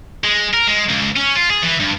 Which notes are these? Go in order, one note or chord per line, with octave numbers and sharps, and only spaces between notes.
G#3
A#4
G#3
C#2
C#4
F4
G#4
E3
G2